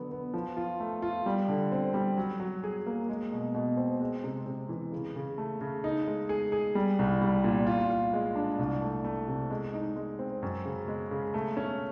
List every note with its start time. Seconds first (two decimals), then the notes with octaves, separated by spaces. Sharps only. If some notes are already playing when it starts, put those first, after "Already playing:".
Already playing: D3 F#3 B3
0.12 B3
0.34 F3
0.57 F4
0.80 A3
1.02 F4
1.26 G3
1.48 D3
1.72 C4
1.94 G3
2.17 F#3
2.40 F#3
2.64 G#4
2.86 A#3
3.09 G#3
3.32 B2
3.55 B2
3.77 C4
4.01 G#3
4.24 C3
4.46 C3
4.69 E3
4.92 C#3
5.16 C#3
5.38 A3
5.61 C#3
5.84 D#4
6.07 G#3
6.29 G#4
6.52 G#4
6.75 G3
6.99 C2
7.22 G3
7.44 A#2
7.67 F4
7.90 F4
8.13 G#3
8.36 D4
8.59 C2
8.82 A3
9.04 A3
9.28 C3
9.50 G#3
9.73 D#4
9.96 G#3
10.19 C4
10.43 F#2
10.65 C#3
10.88 G#3
11.11 C#3
11.34 A3
11.57 C#4